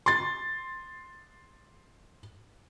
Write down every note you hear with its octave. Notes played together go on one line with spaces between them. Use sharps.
C6 A6